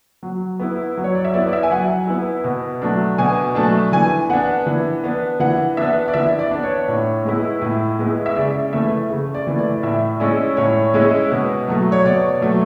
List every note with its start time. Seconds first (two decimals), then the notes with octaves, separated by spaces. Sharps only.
0.23 F#3
0.59 B3 E4
0.97 F#3
1.04 C#5
1.15 D5
1.25 E5
1.34 B3 E4 D5
1.47 D5
1.53 E5
1.63 G#5
1.71 F#3 F#5
2.07 B3 E4
2.44 B2
2.82 F#3 A3 D4
3.18 B2 G#5
3.55 F#3 A3 D4 A5
3.92 E3 G#5
4.29 B3 D4 F#5
4.66 E3
5.03 B3 D4
5.40 E3 F#5
5.77 B3 D4 E5
6.08 D5
6.14 E3 E5
6.39 D5
6.51 B3 D4
6.63 C#5
6.88 A2
7.25 G#3 B3 E4
7.61 A2
7.99 G#3 B3 E4
8.26 E5
8.36 C#3 D5
8.73 E3 A3 E5
9.10 C#3
9.34 D5
9.47 E3 A3
9.59 D5
9.83 A2 E5
10.20 G#3 C#4 E4 D5
10.57 A2 C#5
10.94 G#3 C#4 E4
11.32 B2
11.68 F#3 A3
11.92 C#5
12.05 B2 D5
12.41 F#3 A3